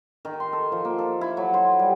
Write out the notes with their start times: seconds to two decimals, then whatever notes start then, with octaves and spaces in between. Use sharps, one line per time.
0.25 D#3
0.40 C6
0.53 A4
0.72 F3
0.85 A#3
0.99 A4
1.21 E4
1.37 F#3
1.54 C5
1.79 G3